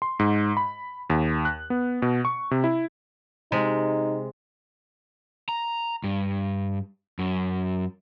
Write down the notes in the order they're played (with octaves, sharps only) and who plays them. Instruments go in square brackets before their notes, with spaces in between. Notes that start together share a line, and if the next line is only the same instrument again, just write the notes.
[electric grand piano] C6
G#2
B5
D#2
F#6
B3
B2
C#6
C3
E4
[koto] C3 G#3 [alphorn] D#4
[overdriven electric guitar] A#5
G2
F#2